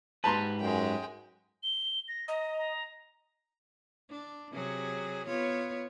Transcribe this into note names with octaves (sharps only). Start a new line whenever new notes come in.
G#2 G4 B4 A5 A#5 C6
F#2 G#3 G5
G7
A#6
D#5 A#5
A#5
D4
C3 F#3 G#4
B3 F4 C#5